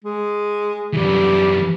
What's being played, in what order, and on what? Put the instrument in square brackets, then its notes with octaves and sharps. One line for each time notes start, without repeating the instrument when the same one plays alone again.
[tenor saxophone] G#3
[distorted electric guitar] F#2 E3 [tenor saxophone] G3